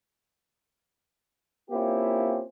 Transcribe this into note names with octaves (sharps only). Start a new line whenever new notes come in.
A#3 C4 C#4 E4 F4 G4